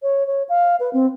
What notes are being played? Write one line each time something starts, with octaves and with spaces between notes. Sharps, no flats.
C#5
C#5
F5
B4
C4